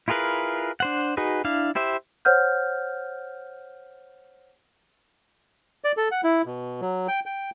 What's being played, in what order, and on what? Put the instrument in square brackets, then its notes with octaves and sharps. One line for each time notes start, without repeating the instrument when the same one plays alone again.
[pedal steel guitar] E4 F4 G#4 A#4 B4
D4 C5 F#5
D#4 F#4 G#4 B4
D4 E4 F5
E4 G4 C5 E5
[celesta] C5 C#5 F#5 F6 G6
[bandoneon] D5
A4
F#5
E4
B2
F#3
G5
G5